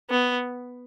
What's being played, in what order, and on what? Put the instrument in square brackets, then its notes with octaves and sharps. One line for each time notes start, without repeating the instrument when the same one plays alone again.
[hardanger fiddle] B3